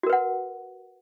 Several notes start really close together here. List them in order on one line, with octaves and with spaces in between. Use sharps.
F#4 A#4 B4 F#5